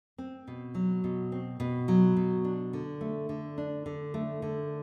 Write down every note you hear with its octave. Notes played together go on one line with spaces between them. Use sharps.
C4
B2
F#3
B2
C4
B2
F#3
B2
D4
D3
A3
D3
D4
D3
A3
D3